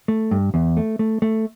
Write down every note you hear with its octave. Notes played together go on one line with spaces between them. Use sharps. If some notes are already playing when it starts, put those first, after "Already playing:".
A3
G2
E2
A3
A3
A3